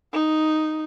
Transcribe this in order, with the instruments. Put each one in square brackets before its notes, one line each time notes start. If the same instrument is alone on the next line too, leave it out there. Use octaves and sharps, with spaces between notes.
[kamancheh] D#4